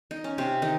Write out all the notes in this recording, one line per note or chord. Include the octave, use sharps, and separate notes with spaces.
D#4
C#4
C3 C4
D#3 D#4